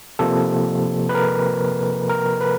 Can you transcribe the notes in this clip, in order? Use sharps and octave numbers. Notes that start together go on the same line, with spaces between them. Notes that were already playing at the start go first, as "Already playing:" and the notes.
C3 F3 A#3 A4
B4
A#4
A#4
B4